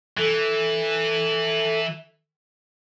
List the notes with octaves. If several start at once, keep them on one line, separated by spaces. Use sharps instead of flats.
E3 A4